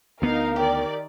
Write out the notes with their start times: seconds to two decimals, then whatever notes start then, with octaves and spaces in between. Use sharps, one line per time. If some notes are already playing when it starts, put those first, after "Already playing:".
0.22 D2 B3 D#4 A#4 F5
0.56 D#3 G4 D5